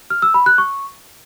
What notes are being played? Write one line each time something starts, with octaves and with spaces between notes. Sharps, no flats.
F6
E6
B5
F#6
C#6